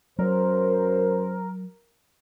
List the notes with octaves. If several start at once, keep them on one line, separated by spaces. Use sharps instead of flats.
F#2 F#3 A#4 C5